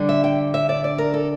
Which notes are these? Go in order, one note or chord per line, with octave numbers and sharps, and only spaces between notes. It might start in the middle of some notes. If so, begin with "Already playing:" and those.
Already playing: D3 G3 D4
E5
G5
E5
D5
D5
A#4
A4